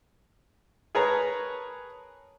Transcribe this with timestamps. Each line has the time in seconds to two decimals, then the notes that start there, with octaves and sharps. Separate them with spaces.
0.95 G#4 A#4 B4 C#5 A5 A#5